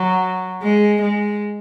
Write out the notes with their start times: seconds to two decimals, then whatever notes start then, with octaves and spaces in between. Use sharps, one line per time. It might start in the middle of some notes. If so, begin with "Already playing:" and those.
Already playing: F#3
0.63 G#3
1.01 G#3